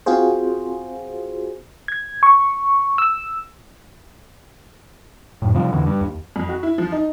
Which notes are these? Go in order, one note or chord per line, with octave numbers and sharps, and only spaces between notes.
C4 F4 F#4 G#4 C5
G#6
C#6
E6
F#2 A2
C3 F3 G3
E2 D3 E3
G2
D#2
F2
F#4
E4
F3
D#4